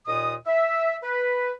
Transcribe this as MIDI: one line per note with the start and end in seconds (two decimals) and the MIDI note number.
0.07 0.34 39
0.07 0.34 46
0.07 0.34 75
0.07 0.34 87
0.46 0.97 76
1.03 1.52 71